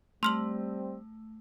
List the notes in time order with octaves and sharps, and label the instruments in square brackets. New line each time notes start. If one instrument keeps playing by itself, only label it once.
[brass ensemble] G3 C4 [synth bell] A3 [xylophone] C6 F6 F#7